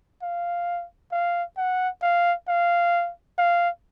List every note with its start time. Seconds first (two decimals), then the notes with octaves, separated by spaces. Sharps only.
0.22 F5
1.12 F5
1.57 F#5
2.02 F5
2.48 F5
3.38 F5